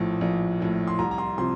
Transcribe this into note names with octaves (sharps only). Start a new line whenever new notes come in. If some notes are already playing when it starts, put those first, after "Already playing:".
Already playing: A#1 A2 F3
A#1
A2 F3
C6
C2 A#5
A#5
C6
C3 F3 C6